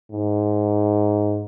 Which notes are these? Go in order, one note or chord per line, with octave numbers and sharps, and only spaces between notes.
G#2